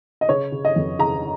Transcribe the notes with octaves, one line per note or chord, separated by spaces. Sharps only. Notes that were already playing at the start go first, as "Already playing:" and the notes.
D#5
C#3 C#5
C#3
D#5
F2
C#3 A#5